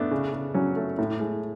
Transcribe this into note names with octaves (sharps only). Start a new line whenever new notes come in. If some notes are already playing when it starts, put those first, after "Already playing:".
Already playing: A3 B3 D4
C#3
C#3
F#3 C#4
A3
A2
G#3